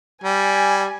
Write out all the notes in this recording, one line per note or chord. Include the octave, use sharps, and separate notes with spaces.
G3 G#5